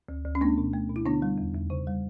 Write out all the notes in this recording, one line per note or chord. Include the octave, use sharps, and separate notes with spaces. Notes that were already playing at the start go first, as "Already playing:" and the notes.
D2
D2
C#4
A3 B3 D4
B2
A3
B2
E4
D3 B3 D4
G3
E2
E2
C#3
G3